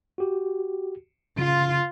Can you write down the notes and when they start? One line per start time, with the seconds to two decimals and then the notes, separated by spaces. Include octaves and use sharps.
0.18 F#4 G4
1.38 C#3 F4